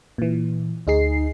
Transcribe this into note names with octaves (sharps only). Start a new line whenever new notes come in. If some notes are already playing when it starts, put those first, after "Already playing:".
A#2 E3
D2 D#4 G#4 C7